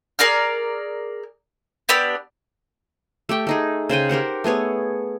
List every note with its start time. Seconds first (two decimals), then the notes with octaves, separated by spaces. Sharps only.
0.19 G#4 A#4 D5 F6
1.89 B3 D4 G4 E6
3.29 A3 G4 G5 C#6
3.47 A3 D#4 G#4
3.89 C#3 C5 G5 G#5
4.09 G4 A#4 C5 F#5
4.44 A3 B3 G#4 C#5